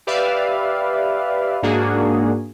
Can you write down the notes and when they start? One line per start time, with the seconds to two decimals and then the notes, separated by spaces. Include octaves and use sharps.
0.07 G4 B4 D5 E5 F5
1.63 G#2 A#3 D4 F#4 G#4